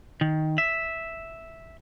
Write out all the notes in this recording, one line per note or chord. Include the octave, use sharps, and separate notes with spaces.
D#3
E5